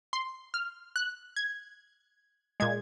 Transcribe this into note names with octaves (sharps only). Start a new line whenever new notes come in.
C6
F6
F#6
G#6
A#2 G#3 G#6